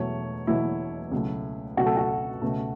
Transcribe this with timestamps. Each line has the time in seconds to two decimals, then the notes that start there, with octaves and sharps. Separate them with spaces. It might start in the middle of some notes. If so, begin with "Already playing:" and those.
Already playing: E1 E2 B2 F#3 A3 C#5
0.47 E1 E2 B2 F#3 A3 E4
1.11 C#2 B2 F#3 A3
1.77 C#2 B2 F#3 A3 F#4
1.86 A4
1.97 F#4
2.42 C#2 B2 A3